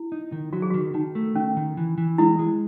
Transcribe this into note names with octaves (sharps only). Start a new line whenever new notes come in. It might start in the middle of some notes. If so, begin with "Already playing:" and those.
Already playing: E4
D#4
D#3
F#3 F#4
G#4
D#3 F#4
D#3 D#4
A3
D#3 C#4
D#3
E3
E3
G#3 E4
G#3